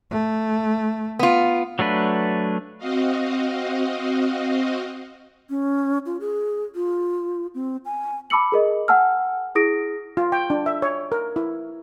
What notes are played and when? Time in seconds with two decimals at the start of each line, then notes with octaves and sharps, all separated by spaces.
0.11 A3
1.19 B3 F4
1.79 F#3 A3 D4 B4
2.78 C4 F#4 D#5 F5
5.50 C#4
6.06 F4
6.21 G#4
6.75 F4
7.55 C4
7.85 G#5
8.30 A5 B5 D6 E6 C#7 F#7
8.52 G#4 A#4 D#5
8.88 F#5 G#5 A5 E6 F6
9.55 E4 G#4 D#6 A#6 D7
10.17 F4
10.32 G5
10.50 D4
10.66 E5
10.82 C#5
11.12 A#4
11.36 E4